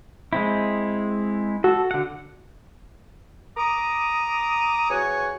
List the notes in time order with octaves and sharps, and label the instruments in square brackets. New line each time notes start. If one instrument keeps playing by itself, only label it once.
[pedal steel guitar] G#3 C4 E4
[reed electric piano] F#4 [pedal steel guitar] A4
[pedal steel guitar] D3 F#5
[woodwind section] A#5 D6 D#6
E2 F#4 C#5 F#5 G#5